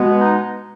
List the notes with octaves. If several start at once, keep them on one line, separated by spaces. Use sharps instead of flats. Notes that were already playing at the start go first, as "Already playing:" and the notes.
Already playing: B2 G#3 B3
D#4